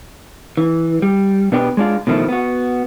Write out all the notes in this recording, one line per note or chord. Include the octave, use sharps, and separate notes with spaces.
E3
G3
B2 B3 D4 G4 A4 B4
G#3 D4 F4
B2 D#3 F3 A3 E4
B3 F#4